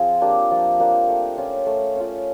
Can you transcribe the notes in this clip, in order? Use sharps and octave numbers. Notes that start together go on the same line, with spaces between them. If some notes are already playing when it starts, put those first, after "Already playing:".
Already playing: F3 C4 F4 G#4
A#3 D4 G4
F3
A#3 D4 G4
A3
C#4 F4
A3
C#4 F4